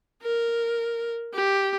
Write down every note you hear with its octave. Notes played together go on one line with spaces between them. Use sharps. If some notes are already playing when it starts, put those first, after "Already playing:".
A#4
G4